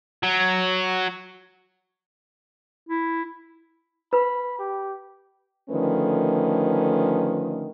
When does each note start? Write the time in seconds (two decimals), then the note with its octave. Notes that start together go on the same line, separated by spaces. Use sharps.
0.23 F#3
2.89 E4
4.13 B4 B5
4.59 G4
5.70 D3 D#3 F3 A3 C#4 B4